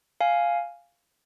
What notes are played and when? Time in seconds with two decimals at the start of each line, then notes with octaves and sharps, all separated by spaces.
0.21 F5 G#5